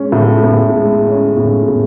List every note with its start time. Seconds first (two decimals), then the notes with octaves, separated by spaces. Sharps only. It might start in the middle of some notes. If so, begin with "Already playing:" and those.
Already playing: G#3 C#4
0.12 A2
0.44 A2
0.75 G#3
1.06 C#4
1.37 A2
1.68 A2